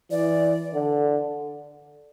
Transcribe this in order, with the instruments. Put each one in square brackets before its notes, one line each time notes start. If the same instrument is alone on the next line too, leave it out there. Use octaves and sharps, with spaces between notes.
[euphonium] E3 [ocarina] D5
[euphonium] D3